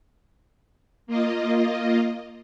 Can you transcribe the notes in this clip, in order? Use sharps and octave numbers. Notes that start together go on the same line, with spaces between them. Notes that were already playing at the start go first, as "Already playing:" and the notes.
A#3 F4 D#5